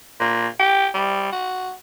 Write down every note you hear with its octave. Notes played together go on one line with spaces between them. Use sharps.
A#2
G4
G3
F#4